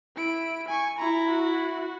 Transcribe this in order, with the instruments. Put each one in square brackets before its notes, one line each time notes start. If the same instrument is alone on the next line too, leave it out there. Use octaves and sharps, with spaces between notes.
[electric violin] E4 D7
G#5 C#6
[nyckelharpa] E4 [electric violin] A#5
[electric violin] F#4